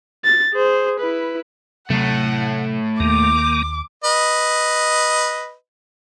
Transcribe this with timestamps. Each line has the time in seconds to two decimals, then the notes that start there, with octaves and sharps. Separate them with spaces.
0.24 A6
0.54 G#4 C5
1.00 E4 B4
1.90 A2 C3 F#3 A3 F#5
3.00 D#2 D#3 A#3 D6
4.04 B4 D#5